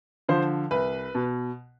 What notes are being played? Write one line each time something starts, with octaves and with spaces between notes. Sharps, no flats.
D3 F3 C5
C2 B4
B2